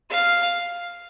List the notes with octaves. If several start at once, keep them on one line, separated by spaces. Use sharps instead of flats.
F5